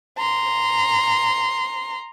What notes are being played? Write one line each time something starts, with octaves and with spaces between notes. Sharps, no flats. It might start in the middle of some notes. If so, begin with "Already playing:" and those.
A#5 C6